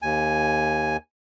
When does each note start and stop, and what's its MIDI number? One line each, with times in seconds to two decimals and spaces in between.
0.02 0.97 39
0.02 0.97 80